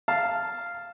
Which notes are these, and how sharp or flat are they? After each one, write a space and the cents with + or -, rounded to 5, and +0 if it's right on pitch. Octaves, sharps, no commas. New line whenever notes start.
F5 -5 A5 +0